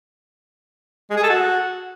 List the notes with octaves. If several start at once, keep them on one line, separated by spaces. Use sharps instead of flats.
G#3
G#4
A4
F#4